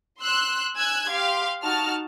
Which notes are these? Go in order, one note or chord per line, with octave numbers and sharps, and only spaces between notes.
C6 E6 F#6
G#5 E6 F#6 G#6
G4 F5 C6
D#4 F#4 A5 F6